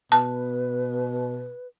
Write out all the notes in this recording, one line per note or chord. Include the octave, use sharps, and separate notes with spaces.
B2 B4 A5